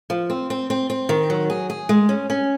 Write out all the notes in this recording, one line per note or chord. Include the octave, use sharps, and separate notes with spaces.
F3
C4
C4
C4
C4
D#3
F#3
G#4
G#4
G#3
C#4
C#4